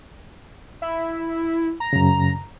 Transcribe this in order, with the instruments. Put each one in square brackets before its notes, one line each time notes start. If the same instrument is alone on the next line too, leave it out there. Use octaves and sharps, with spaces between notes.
[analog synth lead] E4
A#5
[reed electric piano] F#2 C#3